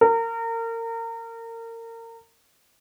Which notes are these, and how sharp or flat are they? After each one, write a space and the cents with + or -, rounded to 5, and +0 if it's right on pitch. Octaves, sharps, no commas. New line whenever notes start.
A#4 -30